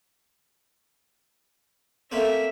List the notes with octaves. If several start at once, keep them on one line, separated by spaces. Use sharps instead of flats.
A3 A#3 C4 E5